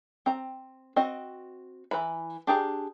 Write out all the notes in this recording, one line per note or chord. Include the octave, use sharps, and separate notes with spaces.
C4 A#5
C4 F#4 D#5
E3 B4 A#5 B5
D4 G4 G#4 A#5